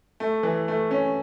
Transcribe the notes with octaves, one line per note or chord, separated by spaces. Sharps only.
A3
E3
A3
C#4